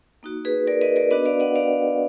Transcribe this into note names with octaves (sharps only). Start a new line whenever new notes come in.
A#3 D#4 F#4
G#4 B4
A#4 D5
B4 D#5
A#4 D5
B3 D4 F#4 B4 D#5
D5 F5
D#5 F#5
D5 F5